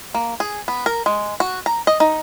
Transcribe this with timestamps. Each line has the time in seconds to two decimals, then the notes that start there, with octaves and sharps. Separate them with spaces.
0.15 A#3
0.40 G#4
0.68 B3
0.86 A#4
1.06 G#3
1.40 F#4
1.66 A#5
1.87 D#5
2.00 D#4